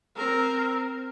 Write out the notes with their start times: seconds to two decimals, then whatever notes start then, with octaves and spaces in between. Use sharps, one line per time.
0.17 C4 A#4